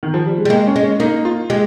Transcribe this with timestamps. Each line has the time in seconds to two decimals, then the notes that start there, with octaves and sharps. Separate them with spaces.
0.03 D#3
0.14 F3
0.26 G3
0.38 G#3
0.45 G3
0.50 G#3 A#3
0.67 C#4
0.76 G#3
0.83 C#4
1.00 A#3 D#4
1.25 F4
1.50 G#3 G4